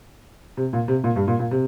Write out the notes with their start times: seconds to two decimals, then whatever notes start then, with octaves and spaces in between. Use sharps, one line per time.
0.57 C3
0.73 A#2
0.88 C3
1.04 A#2
1.16 G2
1.28 A#2
1.39 A#2
1.51 C3